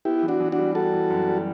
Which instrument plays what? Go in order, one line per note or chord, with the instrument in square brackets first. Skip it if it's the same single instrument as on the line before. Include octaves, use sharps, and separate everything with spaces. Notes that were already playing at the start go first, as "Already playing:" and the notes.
[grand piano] B3 [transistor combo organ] E4 G4
[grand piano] E3
[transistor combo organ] D4 F#4
[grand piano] E3
[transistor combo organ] D4 F#4
[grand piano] G3
[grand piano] G3 [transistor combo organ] F#4 A4
[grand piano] E3
F#2
G3